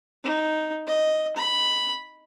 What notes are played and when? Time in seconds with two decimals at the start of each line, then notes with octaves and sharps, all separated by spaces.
0.24 D#4
0.87 D#5
1.36 B5